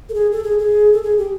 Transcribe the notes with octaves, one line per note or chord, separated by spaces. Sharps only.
A4
G#4
A4
G#4
G#4
A4
G#4
G4